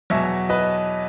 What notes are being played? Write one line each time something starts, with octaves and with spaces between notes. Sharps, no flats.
E2 B2 F#3 C#5 E5
B4 D#5